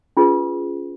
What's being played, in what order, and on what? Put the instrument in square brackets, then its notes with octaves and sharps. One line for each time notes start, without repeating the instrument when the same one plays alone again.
[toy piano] C#4 F4 G#4 B4